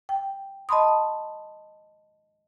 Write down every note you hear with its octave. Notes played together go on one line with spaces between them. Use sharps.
G5
D#5 A5 B5 C6 D#6